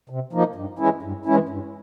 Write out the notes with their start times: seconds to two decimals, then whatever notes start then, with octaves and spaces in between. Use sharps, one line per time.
0.10 C3
0.33 F3 A#3 D#4
0.55 G2
0.79 E3 G#3 C#4 E4
1.03 G2
1.25 E3 G#3 C#4 E4
1.49 G2